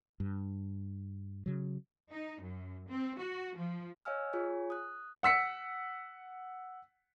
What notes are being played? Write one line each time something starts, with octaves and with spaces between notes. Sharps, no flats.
G2
C#3 F#3
D#4
F#2
C4
F#4
F3
C#5 D#5 F5 G#5 E6 F6
F4 G#4 C#5 G#5
D#6 F#6
F#5 E6 B6 C#7